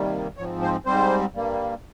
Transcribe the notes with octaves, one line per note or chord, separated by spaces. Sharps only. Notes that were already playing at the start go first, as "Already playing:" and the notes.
Already playing: C3 D#3 G3 A#3
G#2 F3 C4 C#5
C5
G#2 G3 C4 C5
G2 G3 A#3